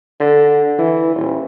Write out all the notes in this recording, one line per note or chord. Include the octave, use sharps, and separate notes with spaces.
D3
E3
D#1